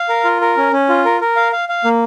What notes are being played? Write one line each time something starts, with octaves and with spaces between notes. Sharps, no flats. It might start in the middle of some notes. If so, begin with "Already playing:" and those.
Already playing: F5
A#4
F4
A#4
C#4
C#4
F4
A#4
A#4
F5
F5
F5
A#3